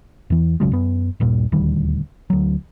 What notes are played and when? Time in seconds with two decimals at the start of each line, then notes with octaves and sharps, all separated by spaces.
0.30 E2 E3
0.60 A#1 C#3 F#3 G#3
0.72 F#2 B3
1.20 D#1 G2 A#2
1.52 D#1 D2 D#3 G3
2.30 D2 F#3